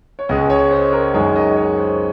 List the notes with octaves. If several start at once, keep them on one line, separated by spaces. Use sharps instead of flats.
C#5
C#2 C#3 G#3 D#5
C#5
C5
A#4
F#2 D#3 G#3 C#5
D#5
C#5
C5